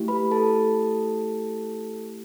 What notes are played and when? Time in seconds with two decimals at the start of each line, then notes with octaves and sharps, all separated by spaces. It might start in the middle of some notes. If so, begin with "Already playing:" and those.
Already playing: A3 E4 G4
0.08 B4 B5
0.31 A4 A5